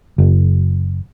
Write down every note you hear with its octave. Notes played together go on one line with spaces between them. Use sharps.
F#1